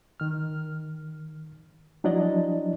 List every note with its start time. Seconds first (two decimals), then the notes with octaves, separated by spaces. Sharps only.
0.20 D#3 F6
2.04 F3 F#3 D4 E4 D5 D#5